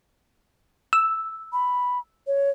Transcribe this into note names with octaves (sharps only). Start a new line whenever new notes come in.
E6
B5
C#5